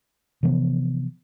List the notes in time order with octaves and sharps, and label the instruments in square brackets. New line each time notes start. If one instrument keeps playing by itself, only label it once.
[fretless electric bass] C3 E3 F3 B3